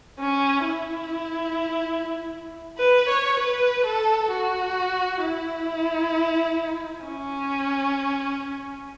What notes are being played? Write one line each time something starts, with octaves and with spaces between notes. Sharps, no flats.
C#4
E4
B4
C#5
B4
A4
F#4
E4
C#4